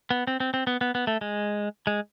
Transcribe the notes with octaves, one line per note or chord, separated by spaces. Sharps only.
B3
C4
C4
C4
B3
B3
B3
A3
G#3
G#3